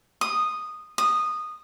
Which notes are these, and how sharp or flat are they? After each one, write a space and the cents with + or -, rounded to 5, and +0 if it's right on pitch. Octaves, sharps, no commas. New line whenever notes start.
D#6 -10
D#6 -15